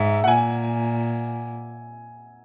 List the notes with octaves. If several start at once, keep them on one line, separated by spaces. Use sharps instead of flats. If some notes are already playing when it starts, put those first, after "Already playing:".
Already playing: G#2 E5
F#5
A#2 G#5